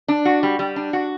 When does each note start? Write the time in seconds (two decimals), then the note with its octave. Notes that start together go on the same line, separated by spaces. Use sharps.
0.08 D4
0.25 F#4
0.43 G3
0.59 G3
0.76 D4
0.93 F#4